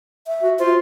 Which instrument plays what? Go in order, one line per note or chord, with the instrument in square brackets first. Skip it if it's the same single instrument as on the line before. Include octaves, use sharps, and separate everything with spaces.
[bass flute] E5
[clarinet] F#4
[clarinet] F4 [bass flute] C5